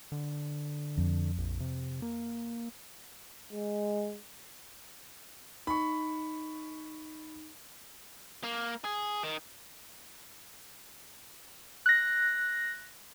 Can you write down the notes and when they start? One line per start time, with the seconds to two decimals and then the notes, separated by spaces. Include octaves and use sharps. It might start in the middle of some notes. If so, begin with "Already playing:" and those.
0.12 D3
0.98 F2
1.38 A#1
1.60 C3
2.02 A#3
3.52 G#3
5.67 D#4 B5 C#6
8.43 A#3
8.84 G#4
9.23 D#3
11.86 F#6 A#6